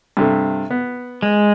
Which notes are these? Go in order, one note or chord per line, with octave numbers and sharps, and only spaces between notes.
G2 C3 A3
B3
G#3